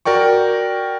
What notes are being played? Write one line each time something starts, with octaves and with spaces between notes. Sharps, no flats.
F#4 A#4 D5 G5 C#6